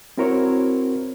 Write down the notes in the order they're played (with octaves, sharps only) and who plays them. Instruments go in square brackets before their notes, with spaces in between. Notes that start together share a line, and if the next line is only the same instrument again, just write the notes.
[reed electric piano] C4 E4 F#4 A#4 C5 C#5